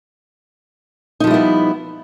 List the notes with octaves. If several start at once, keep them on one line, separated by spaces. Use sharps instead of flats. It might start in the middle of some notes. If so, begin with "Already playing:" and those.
F3 G3 B3 D#4 E4